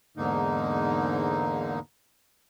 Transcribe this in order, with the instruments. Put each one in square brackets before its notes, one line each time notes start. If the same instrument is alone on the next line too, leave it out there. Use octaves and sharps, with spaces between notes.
[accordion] E2 G#2 D3 A#3 D#4